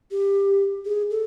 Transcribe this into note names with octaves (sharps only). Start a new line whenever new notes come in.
G4
G#4
A4